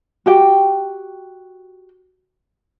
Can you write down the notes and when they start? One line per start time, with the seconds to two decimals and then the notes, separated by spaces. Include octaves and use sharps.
0.26 F#4 G4 G5